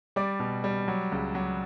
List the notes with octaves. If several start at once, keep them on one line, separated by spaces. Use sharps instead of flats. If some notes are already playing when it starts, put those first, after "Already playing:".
G3 D5 D6
B2
G3
F#3
C#2
F#3